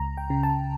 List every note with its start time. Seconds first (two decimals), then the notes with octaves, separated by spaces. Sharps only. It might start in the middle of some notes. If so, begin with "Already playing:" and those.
Already playing: C#2 A#5
0.18 G5
0.30 C#3
0.43 A5